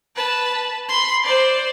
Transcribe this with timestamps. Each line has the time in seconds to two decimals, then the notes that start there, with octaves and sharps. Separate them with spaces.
0.16 B4 A5
0.88 B5 C6
1.24 C5 D5